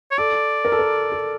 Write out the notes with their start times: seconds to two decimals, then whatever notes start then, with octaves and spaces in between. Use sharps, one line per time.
0.11 C#5
0.18 A4 D5
0.65 A#4
0.72 A4
0.79 A#4
1.12 A4